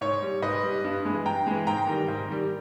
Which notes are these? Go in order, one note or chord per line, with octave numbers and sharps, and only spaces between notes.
G#2 C#5
G3
G#2 B4 D#5
G3
G2
E3 G#3
G2 G5 A#5
E3 G#3
G#2 G5 A#5
D#3 G3
G#2
D#3 G3